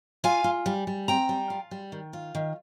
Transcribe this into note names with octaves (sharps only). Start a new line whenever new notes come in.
F4 F5 G#5
F4
G3
G3
C4 G5 A#5
G3
F4
G3
D#3
F4
D#3